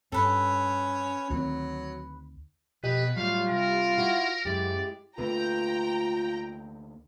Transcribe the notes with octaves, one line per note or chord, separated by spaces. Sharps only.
G2 C#4 A4 B4
D2 D#3 F#3 C4
F2 B2 G4 B4 D#5
A2 F#3 G3 F4 F5
C3 A#4 G5
E4 F#4
F#2 G#3 E4 G4 D5
D2 A3 A#3 F4 B4 G5 A#5